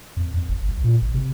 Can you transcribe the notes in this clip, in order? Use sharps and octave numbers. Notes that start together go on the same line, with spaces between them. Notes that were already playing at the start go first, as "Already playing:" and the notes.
F2
F2
G1
C2
A#2
G#1
C3